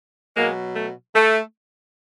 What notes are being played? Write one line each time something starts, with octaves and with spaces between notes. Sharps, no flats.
B2 F#3 G#3 A#3
A3
A3